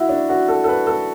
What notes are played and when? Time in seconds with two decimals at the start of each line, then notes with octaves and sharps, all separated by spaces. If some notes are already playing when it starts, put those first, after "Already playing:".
Already playing: E4 F#4
0.09 D4
0.29 F#4
0.48 A4
0.64 A4
0.68 B4
0.87 A4